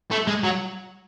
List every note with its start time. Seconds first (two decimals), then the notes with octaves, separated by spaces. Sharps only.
0.11 A3
0.27 G#3
0.44 F#3